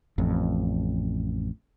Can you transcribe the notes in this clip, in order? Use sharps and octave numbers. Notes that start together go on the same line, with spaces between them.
A1 F2